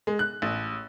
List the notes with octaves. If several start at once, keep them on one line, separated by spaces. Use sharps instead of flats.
G#3
F#6
A1